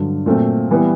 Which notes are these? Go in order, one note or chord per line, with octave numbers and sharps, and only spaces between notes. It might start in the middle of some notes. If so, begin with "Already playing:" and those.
Already playing: G2 D3 F#3
A#2 F#3 A3 C4
E3 G3 B3